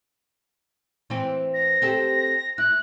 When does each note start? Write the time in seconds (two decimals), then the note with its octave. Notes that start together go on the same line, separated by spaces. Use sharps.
1.10 E3 C4
1.54 A#6
1.82 C4 G4 A4
2.58 E4 F#6